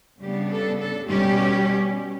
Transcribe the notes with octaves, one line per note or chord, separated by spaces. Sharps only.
C#3 G3 B3 D4 G4
A4
A4
B2 G3 C#4 G4